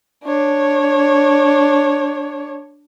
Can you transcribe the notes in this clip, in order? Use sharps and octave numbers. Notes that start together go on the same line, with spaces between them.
D4 C#5